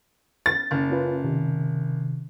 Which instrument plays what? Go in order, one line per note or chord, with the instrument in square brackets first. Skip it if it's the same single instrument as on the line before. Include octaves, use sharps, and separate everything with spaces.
[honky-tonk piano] A6
F#1
[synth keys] C#4 F4 B4
C3 D#3